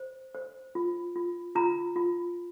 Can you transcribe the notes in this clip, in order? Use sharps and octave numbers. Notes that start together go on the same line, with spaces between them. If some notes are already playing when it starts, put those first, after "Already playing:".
Already playing: C5
C5
F4
F4
F4 A#5
F4